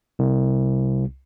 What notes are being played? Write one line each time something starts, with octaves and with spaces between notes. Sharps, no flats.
C2